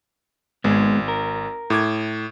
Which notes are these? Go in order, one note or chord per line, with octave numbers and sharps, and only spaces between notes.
G#1 G#2 G#3 B3
A#4
A2 D6 G#6